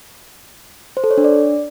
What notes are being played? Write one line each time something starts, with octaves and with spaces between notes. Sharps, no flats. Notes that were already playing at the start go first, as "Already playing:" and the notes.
C5
A4
C#5
D4
D5